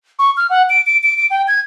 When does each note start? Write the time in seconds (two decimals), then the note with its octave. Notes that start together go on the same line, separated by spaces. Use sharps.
0.19 C#6
0.37 F6
0.50 F#5
0.70 D7
0.87 D7
1.03 D7
1.18 D7
1.30 G5
1.48 G#6